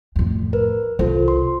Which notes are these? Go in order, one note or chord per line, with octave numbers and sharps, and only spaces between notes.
F2 A2
A#4 B4
C2 E4 F4 A4 C5
C6